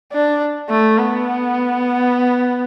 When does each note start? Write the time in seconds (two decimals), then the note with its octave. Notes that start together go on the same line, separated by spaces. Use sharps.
0.12 D4
0.69 A3
0.98 B3